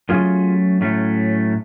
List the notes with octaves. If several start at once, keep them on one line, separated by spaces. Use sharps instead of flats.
A2 F#3 A3 C#4 F4 G#4
A2 F#3 A3 C#4